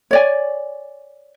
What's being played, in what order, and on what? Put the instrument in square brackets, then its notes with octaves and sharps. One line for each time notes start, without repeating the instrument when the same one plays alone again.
[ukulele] C#5 D5 G#5